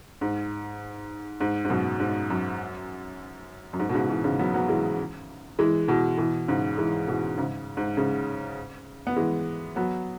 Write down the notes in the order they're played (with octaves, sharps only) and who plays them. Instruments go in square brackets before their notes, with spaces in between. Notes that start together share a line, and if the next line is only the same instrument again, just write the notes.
[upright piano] G#2
G#2
G#2
F#2 B2
G#2
F#2
F#2
G#2
B2
G#2 C#3
B2 E3
G#2 C#3
F#3 B3
F#3 B3
E3 G#3
E3 G#3
B2 E3
B2 E3
G#2 C#3
E3 G#3
B2 E3
G#2 C#3
G#2
G#2 C#3
B3
E3 G#3
F#3 B3